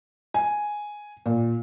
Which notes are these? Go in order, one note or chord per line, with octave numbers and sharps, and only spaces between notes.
G#5
A#2